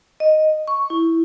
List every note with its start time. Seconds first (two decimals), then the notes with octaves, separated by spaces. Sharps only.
0.20 D#5
0.68 C#6
0.90 E4